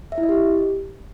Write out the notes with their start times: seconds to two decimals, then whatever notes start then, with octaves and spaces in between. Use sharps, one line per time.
0.12 E5
0.18 E4
0.23 D#5
0.29 G4